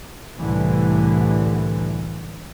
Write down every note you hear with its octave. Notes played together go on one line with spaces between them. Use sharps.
C2 A2 D3 E3